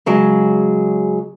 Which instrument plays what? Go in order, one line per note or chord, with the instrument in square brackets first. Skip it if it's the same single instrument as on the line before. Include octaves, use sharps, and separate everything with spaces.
[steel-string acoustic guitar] C#3 F#3 G#3